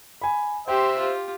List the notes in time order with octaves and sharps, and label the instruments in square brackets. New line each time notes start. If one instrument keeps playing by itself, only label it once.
[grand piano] G#5 B5
[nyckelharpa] G4 C6 [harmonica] C5 E5 [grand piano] G5
[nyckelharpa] F4 G4